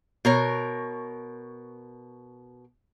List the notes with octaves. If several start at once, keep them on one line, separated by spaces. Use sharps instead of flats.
B2 A#4 C#5